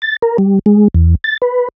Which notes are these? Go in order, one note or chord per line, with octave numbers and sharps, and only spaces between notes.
A6
A#4
G3
G#3
E2
A6
B4